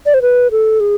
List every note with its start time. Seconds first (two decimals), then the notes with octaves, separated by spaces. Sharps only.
0.06 D5
0.14 C5
0.22 B4
0.51 A4
0.80 G#4